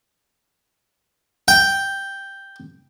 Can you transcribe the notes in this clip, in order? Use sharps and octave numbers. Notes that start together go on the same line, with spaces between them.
G5